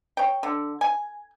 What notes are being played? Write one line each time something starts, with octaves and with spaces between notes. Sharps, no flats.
C#5 G5
D3
G#5